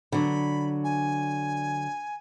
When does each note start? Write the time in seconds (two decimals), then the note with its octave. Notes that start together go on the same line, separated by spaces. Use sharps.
0.12 D3 F#3 B5
0.84 G#5